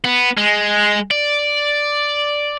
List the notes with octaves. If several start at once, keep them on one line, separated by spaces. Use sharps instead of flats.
B3
G#3
D5